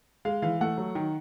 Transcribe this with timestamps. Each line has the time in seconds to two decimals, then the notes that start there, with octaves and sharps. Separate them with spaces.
0.25 G#3 F5
0.42 E3 F5
0.61 A3 F#5
0.78 F#3
0.95 D#3